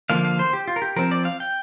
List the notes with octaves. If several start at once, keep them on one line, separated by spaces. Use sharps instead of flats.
D3 F3 A#3 F5
F5
C5
G4
F4
A#4
G4
F3 C4 A#4
D5
F5
G5